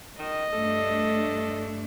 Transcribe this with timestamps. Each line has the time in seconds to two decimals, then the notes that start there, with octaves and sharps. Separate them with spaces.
0.19 D#3 D#5
0.53 G2 A3 D4 A4